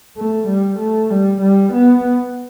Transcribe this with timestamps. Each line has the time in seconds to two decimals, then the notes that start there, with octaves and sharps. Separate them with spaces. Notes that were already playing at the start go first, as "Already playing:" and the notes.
0.17 A3
0.48 G3
0.79 A3
1.10 G3
1.41 G3
1.73 B3